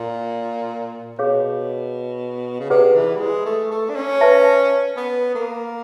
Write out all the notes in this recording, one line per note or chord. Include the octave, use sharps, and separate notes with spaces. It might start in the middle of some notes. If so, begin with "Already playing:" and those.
Already playing: A#2
B2 G#4 C#5 F5
C#3
C3 G#4 B4 D5 F#5
E3
G3
G#3
A3
A3
D4
C#4
B4 E5 A5
B3
A#3